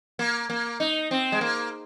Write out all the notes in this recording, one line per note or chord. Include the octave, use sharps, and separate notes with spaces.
A#3
A#3
D#4
C4
G#3
A#3